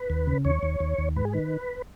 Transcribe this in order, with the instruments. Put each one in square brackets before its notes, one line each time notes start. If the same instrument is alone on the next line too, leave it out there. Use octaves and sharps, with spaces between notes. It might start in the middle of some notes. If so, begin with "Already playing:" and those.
Already playing: [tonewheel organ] B4
D#2
C#3
D#2 C#5
D#2
D#2
D#2
G#2 B4
G#4
D#3 B4